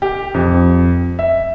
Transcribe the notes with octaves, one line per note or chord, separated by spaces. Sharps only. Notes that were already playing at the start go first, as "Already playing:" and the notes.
G4
F2
E5